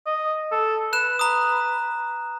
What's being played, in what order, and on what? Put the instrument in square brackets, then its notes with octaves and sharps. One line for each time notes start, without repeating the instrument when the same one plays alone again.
[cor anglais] D#5
A4
[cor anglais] B4 [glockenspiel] F#6 E7
[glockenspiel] A#5 D#6